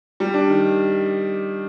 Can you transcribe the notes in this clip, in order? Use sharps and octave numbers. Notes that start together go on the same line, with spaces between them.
G3
D4
D#3